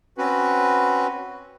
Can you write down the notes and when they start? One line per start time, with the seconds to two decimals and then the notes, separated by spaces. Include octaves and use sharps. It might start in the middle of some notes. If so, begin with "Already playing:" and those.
0.18 C4 C#4 F#4 B4